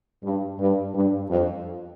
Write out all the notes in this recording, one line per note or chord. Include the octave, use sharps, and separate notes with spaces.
G2
G2
G2
F2